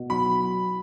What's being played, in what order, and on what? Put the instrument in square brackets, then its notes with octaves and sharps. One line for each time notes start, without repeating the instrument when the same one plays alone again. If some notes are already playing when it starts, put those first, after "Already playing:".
Already playing: [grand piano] B2
[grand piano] F#3 [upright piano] B5